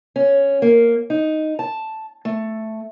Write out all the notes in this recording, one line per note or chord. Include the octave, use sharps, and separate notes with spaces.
C#4
A#3
D#4
A5
A3